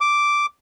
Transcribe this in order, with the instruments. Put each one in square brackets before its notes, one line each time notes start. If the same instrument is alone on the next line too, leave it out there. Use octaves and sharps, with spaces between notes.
[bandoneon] D6